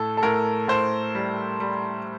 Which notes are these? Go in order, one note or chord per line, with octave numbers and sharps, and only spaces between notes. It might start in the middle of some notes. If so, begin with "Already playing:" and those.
Already playing: A2 A4
A4
A2 A#4
A2 C5
G3
G3